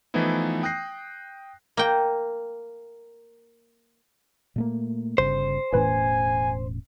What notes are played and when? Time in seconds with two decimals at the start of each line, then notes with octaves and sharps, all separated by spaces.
0.14 E3 F3 A3 B3 D#4 E4
0.63 G5 D#6 F#6 G6 A#6 C7
1.77 A#3 G5
4.56 A#2 A3 A#3
5.18 G1 C#3 C5
5.73 E1 A2 E3 C#4 B4 G#5